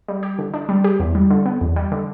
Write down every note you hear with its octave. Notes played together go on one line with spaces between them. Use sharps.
G3
G4
D3
D4
G3
G4
E2
G3
D3
B3
E2
G3
D3